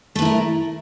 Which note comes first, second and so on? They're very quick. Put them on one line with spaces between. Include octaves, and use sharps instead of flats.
A3 B4 E4 A#4